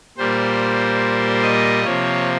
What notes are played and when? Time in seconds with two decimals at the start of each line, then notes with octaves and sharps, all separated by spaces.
0.17 A#2 G3 A#3 C5
1.42 D#5
1.84 C3 F3 A#3 C#5